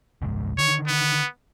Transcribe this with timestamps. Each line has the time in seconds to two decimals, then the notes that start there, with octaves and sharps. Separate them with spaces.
0.22 F#1 C#2 G#2
0.58 D3 D#3 C#5
0.87 B3